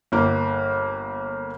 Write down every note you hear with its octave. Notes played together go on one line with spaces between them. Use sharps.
G1 A#3